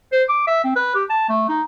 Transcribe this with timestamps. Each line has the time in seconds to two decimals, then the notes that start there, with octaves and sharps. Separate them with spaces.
0.12 C5
0.29 D6
0.47 E5
0.64 C4
0.76 B4
0.95 G4
1.10 A5
1.29 A3
1.49 D#4